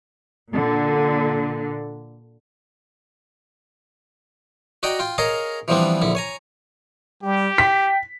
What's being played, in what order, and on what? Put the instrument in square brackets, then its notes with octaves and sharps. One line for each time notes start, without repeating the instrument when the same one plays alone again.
[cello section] A#2 D3
[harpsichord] F#4 D5 D#5 G5 A#5
F4 G5
G#4 A#4 C#5 D#5 F5 A#5
E3 F3 G3 B3 C4 D4
A#1 D3 E4
C#5 G#5 A#5
[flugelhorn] G3 [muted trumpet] G4
[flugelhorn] G5 [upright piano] B6